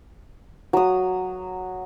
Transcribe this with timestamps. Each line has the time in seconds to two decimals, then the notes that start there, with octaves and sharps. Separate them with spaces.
0.73 F#3 D#6